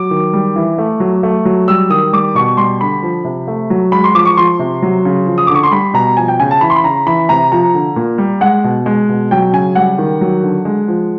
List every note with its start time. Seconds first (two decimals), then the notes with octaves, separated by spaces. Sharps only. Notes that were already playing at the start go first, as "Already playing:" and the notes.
Already playing: F#3 D6
0.11 D#3
0.33 G3
0.56 E3
0.78 A3
1.00 F#3
1.23 A3
1.45 F#3
1.68 G3 E6
1.90 D#3 D#6
2.13 G3 D6
2.35 B2 C#6
2.57 G3 C6
2.81 D3 B5
3.03 F3
3.24 C3
3.48 A3
3.70 F#3
3.92 G#3 B5
4.04 C6
4.15 F3 D6
4.25 C#6
4.37 F3 C6
4.59 C3
4.82 F#3
5.05 C#3
5.27 F3
5.38 D#6
5.47 D3 D6
5.55 C#6
5.63 C6
5.71 G3 B5
5.94 B2 A#5
6.17 F3 G#5
6.28 G5
6.40 C#3 G#5
6.51 A5
6.61 E3 B5
6.70 C6
6.76 B5
6.84 C#3 A#5
7.06 E3 B5
7.29 C3 A#5
7.52 F3 A#5
7.74 D3
7.96 A#2
8.18 G3
8.41 G#3 F#5
8.64 B2
8.86 G#3
9.09 B2
9.31 F#3 G5
9.53 C#3 G#5
9.75 G3 F#5
9.98 D#3
10.21 F#3
10.43 D3
10.65 G#3
10.88 F3